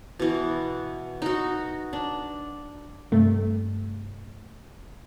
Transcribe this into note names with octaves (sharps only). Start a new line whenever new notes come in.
B2 E3
D#4 F#4
D4
G2 C3 A3